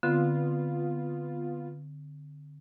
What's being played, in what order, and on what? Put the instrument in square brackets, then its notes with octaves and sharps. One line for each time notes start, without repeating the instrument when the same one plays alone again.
[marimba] D3 C4 [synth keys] B3 F4